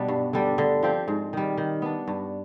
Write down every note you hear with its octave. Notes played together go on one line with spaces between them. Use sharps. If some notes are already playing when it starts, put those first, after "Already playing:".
Already playing: B2 G3 B3 D4
G2
D3 G3 D4
D3
F3 C4 G4
G#2
D#3 G3
D#3
B3 D4
G2